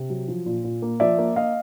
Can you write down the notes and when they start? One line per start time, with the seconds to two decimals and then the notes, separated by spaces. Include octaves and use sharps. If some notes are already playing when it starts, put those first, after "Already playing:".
Already playing: C3
0.10 F#3
0.28 F3
0.46 A#2
0.64 A#2
0.82 A#3
1.00 F3 D5 E5
1.18 A#3
1.36 A#3 D#5 F5